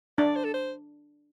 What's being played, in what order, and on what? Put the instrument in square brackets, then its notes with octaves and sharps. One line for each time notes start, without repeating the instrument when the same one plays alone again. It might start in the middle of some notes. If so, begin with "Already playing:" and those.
[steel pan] D4 [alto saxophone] D5
[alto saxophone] C5
A4
C5